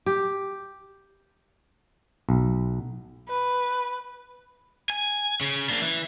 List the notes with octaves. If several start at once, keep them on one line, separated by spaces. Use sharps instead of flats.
G4
B1
B4
G#5
C#3
A#3 D4
E3